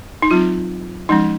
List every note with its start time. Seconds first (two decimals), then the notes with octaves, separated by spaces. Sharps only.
0.22 D#4
0.31 F#3 C4 F4
1.09 F3 G#3 C#4 D#4